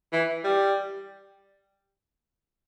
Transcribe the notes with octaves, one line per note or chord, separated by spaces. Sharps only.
E3
G3